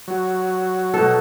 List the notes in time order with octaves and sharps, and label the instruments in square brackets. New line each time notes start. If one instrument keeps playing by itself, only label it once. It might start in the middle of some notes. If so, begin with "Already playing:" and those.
[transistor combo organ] F#3
[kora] B2 A4